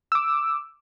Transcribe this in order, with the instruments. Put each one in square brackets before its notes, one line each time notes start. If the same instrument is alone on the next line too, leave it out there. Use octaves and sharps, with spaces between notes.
[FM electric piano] D6 E6